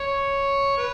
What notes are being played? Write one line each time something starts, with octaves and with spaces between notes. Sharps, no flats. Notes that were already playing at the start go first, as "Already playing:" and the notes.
Already playing: C#5
B4